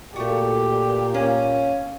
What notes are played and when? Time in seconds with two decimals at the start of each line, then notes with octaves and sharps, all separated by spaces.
0.16 A#2 A3 F#4 G4
1.14 A#3 C#4